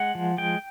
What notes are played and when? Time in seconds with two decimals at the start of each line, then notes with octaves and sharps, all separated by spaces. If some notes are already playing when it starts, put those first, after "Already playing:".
Already playing: G#3 F#5
0.15 F3
0.38 G#3 G5